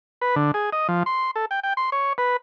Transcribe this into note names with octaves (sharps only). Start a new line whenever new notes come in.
B4
D3
G#4
D#5
F3
C6
A4
G5
G5
C6
C#5
B4